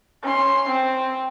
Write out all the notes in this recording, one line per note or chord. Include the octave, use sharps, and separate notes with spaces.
C#4 C6
C4